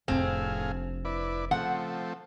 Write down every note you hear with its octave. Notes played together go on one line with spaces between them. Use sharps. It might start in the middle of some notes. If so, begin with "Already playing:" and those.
F1 A2 C4 D4 G#4 F5
E4 B4 D5
C#3 F3 A3 C4 F#5